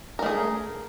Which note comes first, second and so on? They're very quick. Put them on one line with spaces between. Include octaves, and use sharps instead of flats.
A#4 A3 G#4